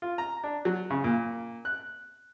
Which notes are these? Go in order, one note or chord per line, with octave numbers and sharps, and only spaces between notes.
F4
A#5
D4
F#3
C#3
A#2
F#6